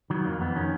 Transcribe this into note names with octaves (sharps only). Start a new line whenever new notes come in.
D#3 F#3
F2 A#3
F2 B3
D#3 C#4